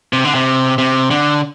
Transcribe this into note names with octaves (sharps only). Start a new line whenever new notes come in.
C3
D3
C3
C3
D3